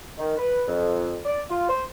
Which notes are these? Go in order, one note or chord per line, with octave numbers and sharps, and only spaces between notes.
D#3
B4
F2
D5
F4
C5